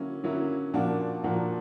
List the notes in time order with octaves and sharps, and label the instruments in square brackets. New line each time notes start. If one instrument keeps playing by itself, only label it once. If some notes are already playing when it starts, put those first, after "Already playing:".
Already playing: [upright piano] D3 F#3 A#3 C#4 E4
D3 F#3 A#3 C#4 E4
A#2 F3 A#3 D4 F#4
A#2 F3 A#3 D4 F#4